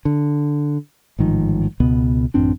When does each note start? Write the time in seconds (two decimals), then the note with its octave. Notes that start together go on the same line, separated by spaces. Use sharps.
0.05 D3
1.19 A1 G#2 D#3 F3
1.80 C#2 B2 B3
2.34 A1 F#2 C4 D4